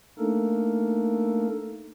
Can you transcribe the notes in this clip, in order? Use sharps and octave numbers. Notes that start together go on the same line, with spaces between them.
A3 A#3 D4 D#4 A4 A#4